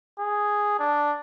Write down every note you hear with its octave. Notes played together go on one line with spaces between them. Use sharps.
G#4
D4